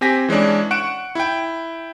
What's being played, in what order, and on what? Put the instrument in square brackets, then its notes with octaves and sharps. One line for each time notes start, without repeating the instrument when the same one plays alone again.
[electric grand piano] C4 G4 G#5 A#6 B6
E3 G#3 C#4 D4
F#5 C#6 F#6 D7 E7
E4 G5